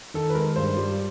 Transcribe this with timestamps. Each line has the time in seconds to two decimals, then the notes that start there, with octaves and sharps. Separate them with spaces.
0.14 D#3 A4
0.30 B4
0.35 G#3 A#4
0.56 G2 C5
0.77 G3